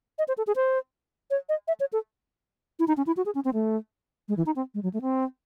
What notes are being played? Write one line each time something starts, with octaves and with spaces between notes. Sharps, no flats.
D#5
C5
A4
G#4
C5
C#5
D#5
E5
C#5
A4
E4
D#4
C#4
E4
F#4
G#4
C#4
C4
A3
G#3
E3
D#4
C4
G#3
F#3
A3
C4